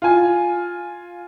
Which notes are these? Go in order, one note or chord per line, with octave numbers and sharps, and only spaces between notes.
F4 G#5